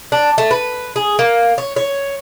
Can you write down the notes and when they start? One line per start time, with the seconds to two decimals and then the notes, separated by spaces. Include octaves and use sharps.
0.12 D4
0.38 A3
0.51 B4
0.96 G#4
1.19 A#3
1.58 C#5
1.76 C#5